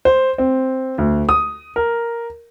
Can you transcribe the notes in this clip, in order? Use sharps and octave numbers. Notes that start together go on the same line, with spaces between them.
C5
C4
D2
D#6
A#4